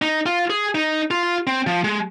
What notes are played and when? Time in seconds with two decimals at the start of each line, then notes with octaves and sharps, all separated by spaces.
0.02 D#4
0.26 F4
0.50 G#4
0.75 D#4
1.11 F4
1.47 C4
1.67 F3
1.84 G#3